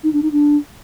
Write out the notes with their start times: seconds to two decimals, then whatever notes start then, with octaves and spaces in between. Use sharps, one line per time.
0.04 D#4
0.13 D4
0.23 D#4
0.32 D4